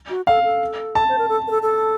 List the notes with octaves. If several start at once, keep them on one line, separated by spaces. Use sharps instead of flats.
F#4
A4 F5
A4
A5
C5
A#4
A4
A#4
A4
A4